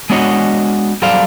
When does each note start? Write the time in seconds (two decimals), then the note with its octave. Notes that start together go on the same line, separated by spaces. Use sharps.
0.10 G#3 B3 D4 F#4 C#5 D#5
1.02 F#3 G3 A4 C5 D5 F5